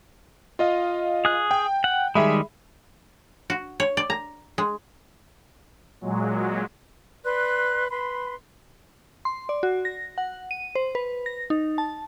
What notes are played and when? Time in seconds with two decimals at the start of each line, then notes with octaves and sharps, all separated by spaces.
0.59 F4 D#5 F5
1.25 G#4 F#6
1.51 G5
1.84 F#5
2.15 D#3 G3 G#3 G#4 E5 B5
3.50 F#4
3.80 C#5
3.97 D5
4.10 A#5
4.58 G#3
6.01 A#2 F#3 G#3
7.24 B4 D5 C6 F#6
7.89 B4 B5 C6
9.25 C6
9.49 D5
9.63 F#4
9.85 A#6
10.18 F#5
10.51 D#7
10.75 C5
10.95 B4
11.26 A#6
11.50 D#4
11.78 A5